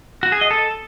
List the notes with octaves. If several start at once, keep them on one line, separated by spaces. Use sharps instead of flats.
F#4
G#4
D#5
A4